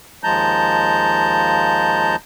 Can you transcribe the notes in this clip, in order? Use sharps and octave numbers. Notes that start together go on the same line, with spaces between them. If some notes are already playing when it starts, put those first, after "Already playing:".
D#2 F3 G#3 A5 A#5 G6